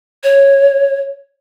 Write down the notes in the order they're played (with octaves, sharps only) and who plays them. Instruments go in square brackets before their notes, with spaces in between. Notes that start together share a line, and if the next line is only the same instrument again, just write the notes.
[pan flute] C#5